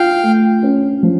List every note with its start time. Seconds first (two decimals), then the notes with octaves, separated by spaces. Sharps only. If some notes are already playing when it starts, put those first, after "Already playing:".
Already playing: F4 F5 G5
0.23 A3
0.63 C#4
1.03 F3